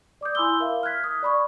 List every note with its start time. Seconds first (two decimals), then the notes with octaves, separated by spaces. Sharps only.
0.21 D5 D6 D#6 G6
0.35 E4 G#5 B5 C6 E6 G7
0.60 A#4 E5 F5
0.83 F6 F#6 G#6 B6
1.04 D#6
1.23 D5 B5 C#6